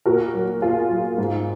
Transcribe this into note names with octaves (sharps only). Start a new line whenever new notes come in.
A#2 F#4 A#4
F#3
A#2 F4 G#4
F#3
G#2